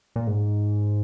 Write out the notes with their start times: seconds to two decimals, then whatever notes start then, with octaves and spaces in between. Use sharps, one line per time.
0.16 A#2
0.27 G#2